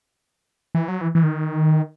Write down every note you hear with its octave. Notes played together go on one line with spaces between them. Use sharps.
E3
F#3
E3
E3
D#3